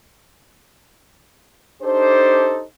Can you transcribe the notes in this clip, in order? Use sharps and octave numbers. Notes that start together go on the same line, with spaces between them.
D4 D#4 G4 A4 C5